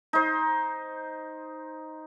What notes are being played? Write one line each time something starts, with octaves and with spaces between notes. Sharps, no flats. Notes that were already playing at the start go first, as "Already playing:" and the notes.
D#4 C5